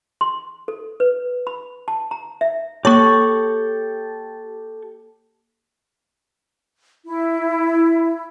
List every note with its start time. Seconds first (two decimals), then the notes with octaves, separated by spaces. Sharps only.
0.21 C6
0.68 A4
1.00 B4
1.47 B5
1.88 A5
2.11 A#5
2.41 E5
2.85 A#3 G4 A4 C#5 C#6
7.05 E4